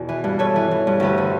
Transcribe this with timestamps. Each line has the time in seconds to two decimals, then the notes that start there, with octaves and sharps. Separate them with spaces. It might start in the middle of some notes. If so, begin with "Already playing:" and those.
Already playing: E2 B2 F#4
0.09 E3
0.24 G2
0.39 G2 A4 C#5
0.56 E3
0.71 E3
0.87 G2
1.00 D2 G4 B4
1.18 D3